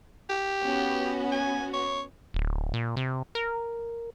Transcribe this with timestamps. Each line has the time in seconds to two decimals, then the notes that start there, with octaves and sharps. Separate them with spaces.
0.29 G4
0.62 B3 C#4 F#4
1.32 G#5
1.73 C#5
2.34 D1
2.74 A#2
2.97 C3
3.35 A#4